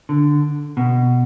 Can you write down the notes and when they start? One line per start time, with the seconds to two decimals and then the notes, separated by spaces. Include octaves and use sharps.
0.09 D3
0.77 B2